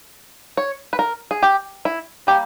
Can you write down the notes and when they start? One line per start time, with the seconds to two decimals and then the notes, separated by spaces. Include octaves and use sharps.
0.57 C#5
0.93 B4
0.99 A#4
1.31 G#4
1.43 G4
1.85 E4
2.27 G3 A#3 G4